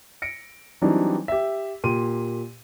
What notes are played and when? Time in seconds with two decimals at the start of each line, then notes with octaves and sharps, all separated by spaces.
0.22 A#6 C#7 D7
0.82 E3 F#3 G3 C4 D4 D#4
1.28 G4 E5
1.84 A#2 G4 C6 D#7